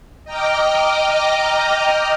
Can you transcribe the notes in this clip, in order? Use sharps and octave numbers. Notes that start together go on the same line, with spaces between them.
D#5 G5 A#5 D6 F6